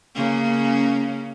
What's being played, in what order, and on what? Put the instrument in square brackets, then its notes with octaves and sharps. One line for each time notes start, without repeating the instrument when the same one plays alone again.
[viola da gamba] C#3 A#3 C#4